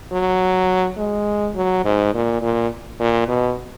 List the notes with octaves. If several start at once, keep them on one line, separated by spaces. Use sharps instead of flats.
F#3
G#3
F#3
G#2
A#2
A#2
A#2
B2